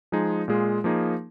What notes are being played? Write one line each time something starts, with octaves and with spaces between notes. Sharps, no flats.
F3 G#3 D#4 G#4
A#2 G#3 F4 G#4
F3 A#3 D#4 G#4